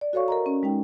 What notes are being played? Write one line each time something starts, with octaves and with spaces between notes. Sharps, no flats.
D5
F#4 A4 C#5 F5 C#6
A#4 D#5 A#5
C#4
G#3 D#4 G5